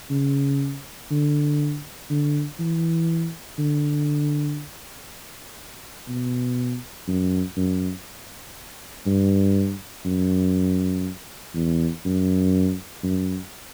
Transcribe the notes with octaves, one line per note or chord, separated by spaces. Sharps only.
C#3
D3
D3
E3
D3
B2
F#2
F#2
G2
F#2
E2
F#2
F#2